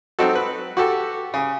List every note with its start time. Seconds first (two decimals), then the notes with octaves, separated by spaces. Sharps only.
0.19 F#3 C4 D#4 F#4 A4
0.35 B4
0.77 F#4 G4 A4
1.34 C#3